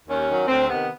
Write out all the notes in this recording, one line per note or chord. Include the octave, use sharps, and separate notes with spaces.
D#2 C#4
D#3 F#3
D2 C4
C3 D#3 B3